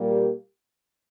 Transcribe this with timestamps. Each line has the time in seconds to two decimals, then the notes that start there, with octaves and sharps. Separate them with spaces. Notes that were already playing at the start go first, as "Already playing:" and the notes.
Already playing: A#2 G3 A#3
0.10 G4